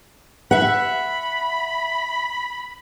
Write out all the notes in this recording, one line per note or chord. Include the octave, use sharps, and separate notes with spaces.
E5 F#5 B5